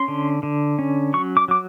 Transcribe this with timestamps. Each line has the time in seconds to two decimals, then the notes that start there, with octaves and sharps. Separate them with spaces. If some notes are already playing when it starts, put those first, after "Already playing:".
Already playing: C#4 C6
0.08 D3
0.43 D3
0.79 C#4
1.13 F#3 C#6
1.37 D6
1.48 F#3 D6